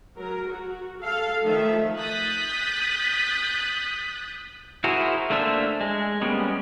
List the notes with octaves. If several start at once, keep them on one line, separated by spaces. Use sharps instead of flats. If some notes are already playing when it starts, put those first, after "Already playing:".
F#3 A#4
F#4
A4 F5
D#3 F3 A3 A4 E5
D#6 F#6 G6 A6 B6
E4 F#4 G#4 A#4 C5
A3 A#3 D4 C5 E5
G#3
G3 G#3 A#3 B3 C#4